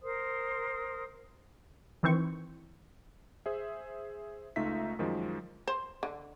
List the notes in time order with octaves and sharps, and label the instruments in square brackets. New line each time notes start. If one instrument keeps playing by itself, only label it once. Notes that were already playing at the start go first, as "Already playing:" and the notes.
[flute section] A#4 C5 C6 D#6
[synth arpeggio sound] D#3 E3 C4 C5 C#6
[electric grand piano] G#4 C5 E5
C#2 A3 D#4 F4 E5 B6
F#2 D#3 F3 G#3
[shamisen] C5
D3